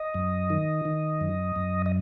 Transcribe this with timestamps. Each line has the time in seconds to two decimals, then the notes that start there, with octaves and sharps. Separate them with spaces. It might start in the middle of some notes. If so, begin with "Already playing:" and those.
Already playing: D#5
0.14 F#2
0.50 D#3
0.85 D#3
1.21 F#2
1.56 F#2
1.86 D#5